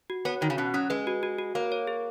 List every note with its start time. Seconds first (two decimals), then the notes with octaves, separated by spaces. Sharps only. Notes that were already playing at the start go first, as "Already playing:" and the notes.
0.10 F#4
0.25 B3 C#5
0.41 D#3 F#4
0.50 C#3
0.58 B2 C#4
0.74 F#3 C#4
0.90 G#3 B4
1.07 F#4
1.23 F#4
1.39 F#4
1.55 A#3 C#5
1.72 C#5
1.87 G#4